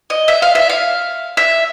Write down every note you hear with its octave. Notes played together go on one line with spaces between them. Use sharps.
D#5
E5
F5
E5
F5
E5